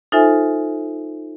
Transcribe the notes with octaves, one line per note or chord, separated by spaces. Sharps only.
D#4 F4 A4 C5 E5 G#5